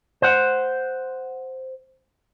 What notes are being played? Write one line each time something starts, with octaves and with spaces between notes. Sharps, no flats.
C5 F#5